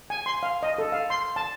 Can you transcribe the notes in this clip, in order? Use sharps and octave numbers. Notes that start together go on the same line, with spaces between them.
G#5
C6
F5
D#5
A4
F5
C6
A5